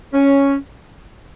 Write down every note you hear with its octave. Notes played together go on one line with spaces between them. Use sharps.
C#4